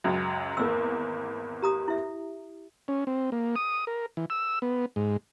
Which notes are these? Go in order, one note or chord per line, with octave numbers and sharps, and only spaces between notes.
C#2 F#2 F#3
G#1 E2 A#3 C6 E6
G4 A#5 D#6
E4 E5
C#4
C4
A#3
D#6
A#4
E3
E6
B3
G#2